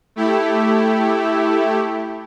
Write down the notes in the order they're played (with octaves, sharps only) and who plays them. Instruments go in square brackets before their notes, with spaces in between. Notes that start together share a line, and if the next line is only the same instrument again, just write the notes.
[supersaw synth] A3 E4 G4